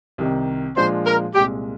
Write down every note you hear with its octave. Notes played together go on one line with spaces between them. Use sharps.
C2 C3 D#3
A#2 F3 G#3 D4 F4 C5
A#4
C2 A#2 G#3 G4